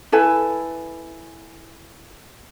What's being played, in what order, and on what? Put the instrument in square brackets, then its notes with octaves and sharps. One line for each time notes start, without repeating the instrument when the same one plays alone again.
[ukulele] E4 A4 B4 G#5